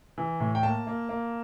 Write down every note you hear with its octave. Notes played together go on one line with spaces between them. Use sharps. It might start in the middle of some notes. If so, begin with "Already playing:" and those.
E3
A2
G5
A#3 A5
A#3
A#3